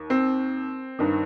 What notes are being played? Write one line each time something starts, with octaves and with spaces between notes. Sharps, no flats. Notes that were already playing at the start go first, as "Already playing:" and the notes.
Already playing: D#2
C4
G2 D#3